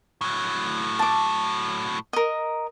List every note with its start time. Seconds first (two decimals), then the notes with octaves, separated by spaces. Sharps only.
0.21 A2 F#3
0.99 A5 D6
2.13 A#4 D#5